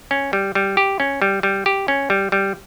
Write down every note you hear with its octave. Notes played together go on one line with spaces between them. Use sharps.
C#4
G3
G3
G4
C#4
G3
G3
G4
C#4
G3
G3